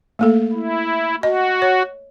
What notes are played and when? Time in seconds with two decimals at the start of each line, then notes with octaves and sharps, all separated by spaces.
0.19 A3 A#3 A4
0.53 E4
1.23 F#4 D#5
1.62 C#5